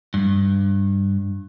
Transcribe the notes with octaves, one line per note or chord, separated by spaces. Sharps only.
G2